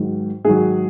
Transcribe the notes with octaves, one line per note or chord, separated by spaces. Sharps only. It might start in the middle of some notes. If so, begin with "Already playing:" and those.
Already playing: G#2 D#3 F#3
G#2 D#3 F#3 G#4